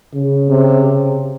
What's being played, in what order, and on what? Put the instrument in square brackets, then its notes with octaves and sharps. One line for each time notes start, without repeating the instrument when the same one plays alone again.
[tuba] C#3
[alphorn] C3